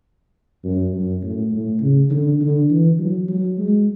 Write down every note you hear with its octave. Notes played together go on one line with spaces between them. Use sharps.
F#2
F#2
A2
A2
C#3
D3
D3
E3
F#3
F#3
G#3